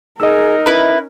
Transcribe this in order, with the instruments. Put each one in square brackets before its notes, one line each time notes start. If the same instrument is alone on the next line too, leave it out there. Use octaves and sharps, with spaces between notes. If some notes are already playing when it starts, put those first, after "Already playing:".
[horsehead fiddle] D#4 A#4 [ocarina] G#4 [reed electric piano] D#5 E6
[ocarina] C#4 [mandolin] E4 B4